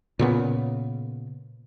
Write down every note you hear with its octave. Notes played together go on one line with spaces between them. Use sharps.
A#2 C#3 B3